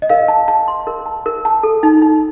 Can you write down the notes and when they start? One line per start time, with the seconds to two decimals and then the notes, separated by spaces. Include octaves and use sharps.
0.02 D#5
0.09 A#4 F5
0.28 A5
0.48 A5
0.68 C6
0.87 A#4
1.06 A5
1.26 A#4
1.45 A5
1.63 A4
1.83 D#4
2.02 D#4